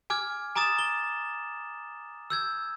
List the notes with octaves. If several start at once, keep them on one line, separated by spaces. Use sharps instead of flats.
G#5 D6 F6 G#6
G#5 A#5 D6 D#6 A6 E7
G7
E6 G6 G#6